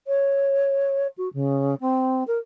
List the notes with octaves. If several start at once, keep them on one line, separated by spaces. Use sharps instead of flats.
C#5
F#4
C#3
C4
A#4